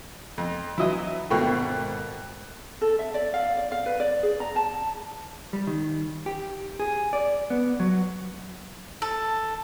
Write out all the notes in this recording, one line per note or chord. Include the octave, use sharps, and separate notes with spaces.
F2
E3 F#3 E4 D#5 D#6
G#1 B2 A3 A#3 G5 C#6
A4
E5
D5
F5
D5
F5
B4
D5
G#4
A#5
A5
G3
D#3
G4
G#4
D5
B3
F#3
A4